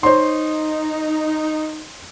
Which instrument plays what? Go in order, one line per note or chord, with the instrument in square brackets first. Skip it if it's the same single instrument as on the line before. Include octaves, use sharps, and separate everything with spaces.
[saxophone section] D#4 [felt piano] C5 C#5 C6